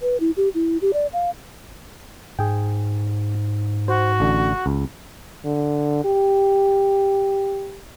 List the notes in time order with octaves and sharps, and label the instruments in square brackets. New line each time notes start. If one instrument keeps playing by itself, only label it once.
[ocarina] B4
E4
G4
E4
G4
D5
F5
[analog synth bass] G#2 [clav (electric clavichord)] G#4 G5
[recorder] F#4 [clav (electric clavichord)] C5
[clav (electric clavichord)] A1 D3
C#2
[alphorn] D3
G4